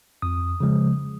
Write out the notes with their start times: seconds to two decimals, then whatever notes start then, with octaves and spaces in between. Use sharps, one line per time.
0.22 F2 D#6
0.60 C#3 F3 G#3